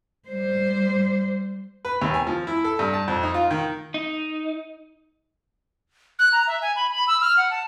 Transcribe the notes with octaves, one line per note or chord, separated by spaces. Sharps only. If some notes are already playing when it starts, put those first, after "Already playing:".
G3 C5
B4
D#2
G#5
F3
E4
A4
G2
A5
F2
D#4
F4
D#3
D#4
F#6
A#5
E5
G#5
B5
B5
E6
F6
F#5
A5